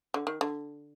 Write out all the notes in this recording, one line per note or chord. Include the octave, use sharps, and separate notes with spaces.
D3
D#3
D3